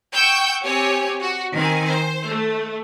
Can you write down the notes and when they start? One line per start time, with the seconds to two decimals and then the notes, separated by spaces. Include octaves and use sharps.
0.14 F#5 G5 C#6 E6 G6
0.64 C4 G4 C#5 G#5
1.21 F#4
1.54 D#3 C4 G#5
1.89 C5
2.28 A3